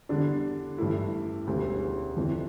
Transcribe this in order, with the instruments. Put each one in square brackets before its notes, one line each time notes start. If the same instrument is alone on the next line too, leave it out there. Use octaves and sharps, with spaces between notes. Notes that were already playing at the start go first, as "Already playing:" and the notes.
[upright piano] E2 D3 G3 D4
A1 G2 E3 A3 E4
E1 D2 C#3 G3
F1 F2 E3